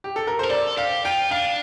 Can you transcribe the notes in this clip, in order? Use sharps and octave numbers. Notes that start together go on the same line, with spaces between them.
G4
A4
A#4
C5
A#4
A4 D5
G4 F5
F4 G5
D4 F5